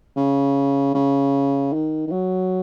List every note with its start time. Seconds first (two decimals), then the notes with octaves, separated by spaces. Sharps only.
0.17 C#3
0.95 C#3
1.73 D#3
2.07 D#3
2.11 F#3